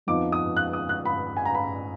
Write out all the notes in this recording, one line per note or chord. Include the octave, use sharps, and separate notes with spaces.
F2 F3 B3 D#4 D6
D#6
F#6
D#6
F#6
B5
G#5
A#5
B5